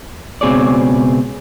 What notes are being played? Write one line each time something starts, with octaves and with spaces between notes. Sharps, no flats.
C#2 B2 C4 G#4 C#5 D5